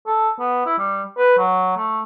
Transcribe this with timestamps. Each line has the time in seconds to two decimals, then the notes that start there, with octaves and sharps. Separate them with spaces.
0.07 A4
0.39 B3
0.66 E4
0.78 G3
1.18 B4
1.38 F#3
1.77 A3